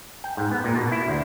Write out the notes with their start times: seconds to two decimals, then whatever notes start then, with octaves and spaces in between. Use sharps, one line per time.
0.24 G5
0.37 G#2
0.51 B3
0.64 A#2
0.76 B2
0.92 E4
1.08 D2